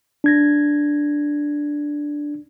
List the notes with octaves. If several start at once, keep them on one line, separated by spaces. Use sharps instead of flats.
D4 G#6 A#6